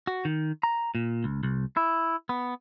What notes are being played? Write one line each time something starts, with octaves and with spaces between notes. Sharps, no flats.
F#4
D#3
A#5
A#2
C#2
C2
E4
B3